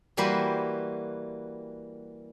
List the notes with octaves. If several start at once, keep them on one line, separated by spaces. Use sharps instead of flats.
E3 G3 A#3 F#4 B4 C5